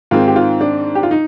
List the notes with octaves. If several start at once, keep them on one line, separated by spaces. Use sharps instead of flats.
G#2 D#3 G#3 C4 F4
G4
F4
D4
G4
F4
D#4